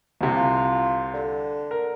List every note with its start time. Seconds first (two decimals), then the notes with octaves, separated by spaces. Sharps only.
0.21 C2 C3
0.36 F4
1.14 D3
1.71 A#4